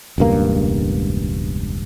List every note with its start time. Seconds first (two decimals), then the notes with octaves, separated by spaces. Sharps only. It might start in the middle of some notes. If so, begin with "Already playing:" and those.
0.18 E1 C#2 G2 A#3